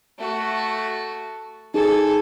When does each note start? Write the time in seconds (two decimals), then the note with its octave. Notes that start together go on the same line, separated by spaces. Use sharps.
0.18 A3 F#4
1.74 D#4 G#4 A4 G#5